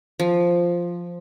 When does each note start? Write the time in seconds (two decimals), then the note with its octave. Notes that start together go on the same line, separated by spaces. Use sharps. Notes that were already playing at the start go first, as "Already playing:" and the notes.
0.20 F3